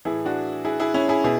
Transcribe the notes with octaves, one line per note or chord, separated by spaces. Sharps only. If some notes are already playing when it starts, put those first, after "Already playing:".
A2 E3 E4 G#4
D4 F#4
E4 G#4
E4 G#4
C#4 E4
E4 G#4
B2 E4 G#4